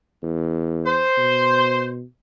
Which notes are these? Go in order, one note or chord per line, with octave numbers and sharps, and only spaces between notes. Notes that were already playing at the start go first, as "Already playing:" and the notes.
E2
C5
B2